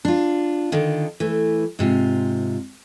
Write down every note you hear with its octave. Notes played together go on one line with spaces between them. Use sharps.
D4 F4
D3 D#3 F4
E3 A3
G#2 C3 F4